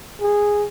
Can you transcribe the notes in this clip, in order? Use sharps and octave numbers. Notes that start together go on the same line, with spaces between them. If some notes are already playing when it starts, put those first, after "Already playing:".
G#4